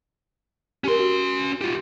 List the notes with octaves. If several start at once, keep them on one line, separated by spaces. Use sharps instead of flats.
C#4 G4 A#4 C6
F#4
F4 G4